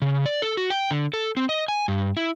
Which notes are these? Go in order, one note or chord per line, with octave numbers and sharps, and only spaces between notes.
C#3
D5
A4
F#4
G5
D3
A4
C4
D#5
G#5
G2
E4